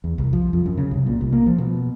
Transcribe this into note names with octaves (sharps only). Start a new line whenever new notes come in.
E2
C2
F3
F2
F#2
C#3
C2
A#2
C2
A#3
F3
B2